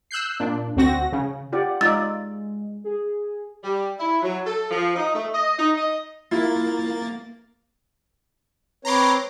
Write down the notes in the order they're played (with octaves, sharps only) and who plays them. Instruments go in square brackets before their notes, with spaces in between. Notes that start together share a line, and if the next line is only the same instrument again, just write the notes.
[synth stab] E6 F#6 G6 C7
A#2 D4
D2 C4 F#4 A#6
C#3
[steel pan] F4 G4 D5 [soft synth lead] F#5
[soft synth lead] G#3 [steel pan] D#4 F4 D5 [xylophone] E6 A6
[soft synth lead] G#4
[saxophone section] G3
E4
F#3
A4
F3
D#4
A3
D#5
D#4
D#5
[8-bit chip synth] A#3 A6 [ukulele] E4 F4
[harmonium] C4 B4 C#5 [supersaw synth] A#5 C6 D6